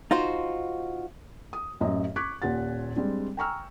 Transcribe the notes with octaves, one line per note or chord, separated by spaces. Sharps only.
D#4 F4 F#4 C5
D#6
A1 F#2 D#5
C#6 D6 F#6 G#6 B6
D#1 A#2 G4 F#5 A6
G3 G#3 C4 D4
G5 G#5 A#5 C#6 E6 F6